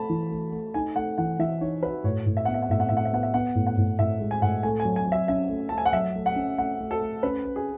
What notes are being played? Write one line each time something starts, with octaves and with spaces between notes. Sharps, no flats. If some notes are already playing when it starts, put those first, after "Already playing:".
Already playing: A3 A5 B5
E3
A3
A3
D#4 G#5
A3 F#5
E3 F#5
E3 E5
D#4 C#5
F#4 B4
A2 C#5
A2
E5
B3 F#5
E5
F#5
A2 E5
F#5
A2 E5
F#5
E5
B3 F#5
E5
B3 F#5
A2
F#5
A2
A2 E5
G#3
G#5
A2 F#5
A3 G#5
G#5
F#3
G#5
F#3 E5
C#4 E5
A3
A3 A5
G#5
F#5
F#3 E5
A3
F#5
C#4
A3 F#5
A3
A4
A3
C#4 B4
B4
G#4